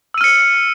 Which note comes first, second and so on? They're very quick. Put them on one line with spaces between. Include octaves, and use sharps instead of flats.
E6 D#7 F6 C#7